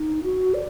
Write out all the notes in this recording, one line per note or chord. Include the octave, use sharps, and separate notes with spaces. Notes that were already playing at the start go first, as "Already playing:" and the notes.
Already playing: D#4
F#4
D5